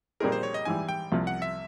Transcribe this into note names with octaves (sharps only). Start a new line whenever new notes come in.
A#2 G3 C4 D#4 G#4 A#4
C5
C#5
D#5
G#2 E3 G3 G#5
G5
C2 C3 F3
F#5
E5